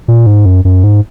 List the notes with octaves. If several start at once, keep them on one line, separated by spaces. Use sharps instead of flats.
A#2
G#2
F#2
F#2
G#2